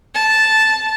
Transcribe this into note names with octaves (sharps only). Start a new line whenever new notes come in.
A5